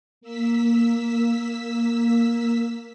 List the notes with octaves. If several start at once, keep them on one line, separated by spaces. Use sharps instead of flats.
A#3 E6 B6